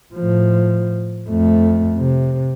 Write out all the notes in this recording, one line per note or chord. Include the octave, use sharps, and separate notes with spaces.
A2 F3
F2 A3
C3